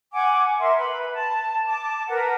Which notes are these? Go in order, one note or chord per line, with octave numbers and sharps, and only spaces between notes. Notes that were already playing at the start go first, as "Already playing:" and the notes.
F#5 G#5 D6
A#4 E5 C6
B4 B5
A5
A5 D6
A#4 B4 F#5